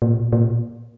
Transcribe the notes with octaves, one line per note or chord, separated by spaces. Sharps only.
A#2
A#2